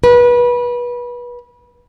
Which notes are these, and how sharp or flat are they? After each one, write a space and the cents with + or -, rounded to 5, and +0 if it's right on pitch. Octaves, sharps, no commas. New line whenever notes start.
B4 -25